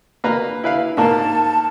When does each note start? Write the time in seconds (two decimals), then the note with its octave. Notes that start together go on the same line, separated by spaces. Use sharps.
0.24 A#3 B4 A#5
0.64 E4 B4 F5
0.97 G#2 A#3 A#4 A5